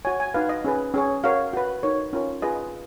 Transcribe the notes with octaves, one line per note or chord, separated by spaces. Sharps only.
F#4 C#5 G#5
G#5
D#4 F#4 B4 F5
D#5
C#4 G#4 B4
C#4 G#4 C#5
F#4 A#4 C#5 F5
F#4 B4
D#4 A#4 C#5
C#4 F4 A#4 C#5
F4 G#4 B4 D#5